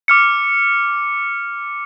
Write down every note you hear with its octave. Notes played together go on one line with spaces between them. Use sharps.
D6 F6 C#7